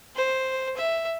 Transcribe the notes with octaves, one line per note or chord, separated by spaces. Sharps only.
C5
E5